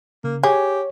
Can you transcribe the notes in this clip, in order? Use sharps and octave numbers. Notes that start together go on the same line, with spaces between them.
C#3 A#3
G4 G#4 C#5